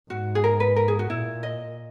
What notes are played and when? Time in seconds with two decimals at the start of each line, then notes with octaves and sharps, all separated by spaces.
0.10 G#2 F#4
0.35 G#4
0.44 A#4
0.60 B4
0.76 A#4
0.88 G#4
0.99 F#4
1.10 A#2 E4
1.43 D#5